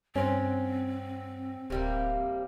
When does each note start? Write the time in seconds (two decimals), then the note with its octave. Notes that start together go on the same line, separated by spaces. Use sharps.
0.16 G2 C4 C#4 C5 F#5
1.70 D1 C3 G3 A#3